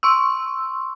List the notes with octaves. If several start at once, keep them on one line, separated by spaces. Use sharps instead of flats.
C6 C#6 E6